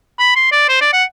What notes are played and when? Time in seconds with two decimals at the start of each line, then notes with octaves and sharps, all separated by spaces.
0.19 B5
0.36 C6
0.52 D5
0.69 C5
0.81 D5
0.93 F#5